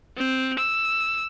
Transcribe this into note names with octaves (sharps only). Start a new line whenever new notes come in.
C4
E6